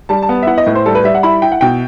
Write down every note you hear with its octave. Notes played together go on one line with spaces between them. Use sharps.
G3 A5
A5
B3
E5
E4 F#5
D#5
A2 B4
C5
G3 A4
B4
G3 E5
F#5
E4 B5
E4 G5
F#5
B2 G5